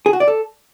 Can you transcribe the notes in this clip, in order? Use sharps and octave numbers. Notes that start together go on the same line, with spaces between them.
G#4
F#4
D5
A4